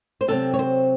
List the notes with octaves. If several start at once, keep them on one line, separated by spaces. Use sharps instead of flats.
C5
C3 F#3 C4 A4
C#5
C5